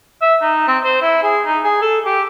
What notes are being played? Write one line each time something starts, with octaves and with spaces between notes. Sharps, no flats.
E5
D#4
C4
C5
E4
G#4
D#4
G#4
A4
G4